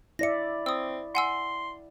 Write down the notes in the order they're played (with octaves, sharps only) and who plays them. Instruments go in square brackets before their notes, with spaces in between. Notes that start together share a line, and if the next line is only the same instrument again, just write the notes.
[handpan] E4 D5 E5 [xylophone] A#6 C#7
[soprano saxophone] C4 [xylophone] D#6 E6
[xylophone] F#5 G#5 E6 [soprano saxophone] C6